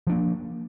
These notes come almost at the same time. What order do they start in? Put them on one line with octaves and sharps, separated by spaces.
F3 D4 A#3